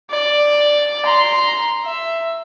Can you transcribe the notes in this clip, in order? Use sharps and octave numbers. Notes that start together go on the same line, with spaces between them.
D5
A#5 C6
E5